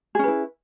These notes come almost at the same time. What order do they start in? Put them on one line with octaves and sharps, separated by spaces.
G#4 C#4 B4 E4